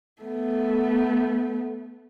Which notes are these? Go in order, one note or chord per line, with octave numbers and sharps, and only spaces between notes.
A3 B3